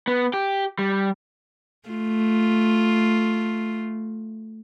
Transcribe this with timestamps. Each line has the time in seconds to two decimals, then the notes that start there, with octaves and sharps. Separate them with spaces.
0.07 B3
0.34 G4
0.79 G3
1.88 A3 F4